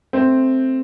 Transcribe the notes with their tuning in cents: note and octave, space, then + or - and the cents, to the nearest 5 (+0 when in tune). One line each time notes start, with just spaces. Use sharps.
A3 +0 C4 +0